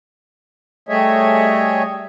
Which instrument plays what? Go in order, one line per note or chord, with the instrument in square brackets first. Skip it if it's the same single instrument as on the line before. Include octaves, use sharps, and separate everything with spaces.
[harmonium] G3 A3 G#4 C#5 D#5 E5